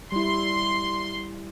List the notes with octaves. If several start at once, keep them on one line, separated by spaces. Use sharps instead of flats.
G3 E4 C6